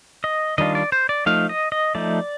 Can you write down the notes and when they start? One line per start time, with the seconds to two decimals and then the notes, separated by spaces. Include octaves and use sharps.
0.24 D#5
0.58 D#3 G3 D4 F4 D#5
0.75 D5
0.92 C5
1.09 D5
1.26 F3 A3 D#4 F5
1.49 D#5
1.72 D#5
1.95 F3 A3 D#4 D5